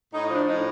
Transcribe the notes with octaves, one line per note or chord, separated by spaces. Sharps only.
A2 D#4
F3 D4
A2 D#4